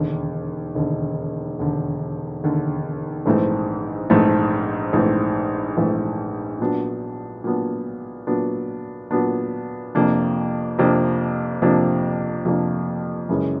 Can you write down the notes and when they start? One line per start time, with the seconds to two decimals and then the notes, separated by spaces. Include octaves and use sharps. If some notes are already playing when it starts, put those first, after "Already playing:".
Already playing: E1 D#2 D3
0.75 E1 D#2 D3
1.59 E1 D#2 D3
2.43 E1 D#2 D3
3.26 A#1 G#2 E3 A3 C4
4.10 A#1 G#2 E3 A3 C4
4.93 A#1 G#2 E3 A3 C4
5.77 A#1 G#2 E3 A3 C4
6.60 A#2 F#3 B3 D4
7.44 A#2 F#3 B3 D4
8.27 A#2 F#3 B3 D4
9.11 A#2 F#3 B3 D4
9.95 F2 C3 F3 A#3 D4
10.78 F2 C3 F3 A#3 D4
11.62 F2 C3 F3 A#3 D4
12.45 F2 C3 F3 A#3 D4
13.29 F#2 C#3 E3 G#3 C#4